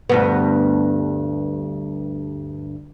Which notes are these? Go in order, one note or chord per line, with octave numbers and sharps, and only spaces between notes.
D2 G2 B3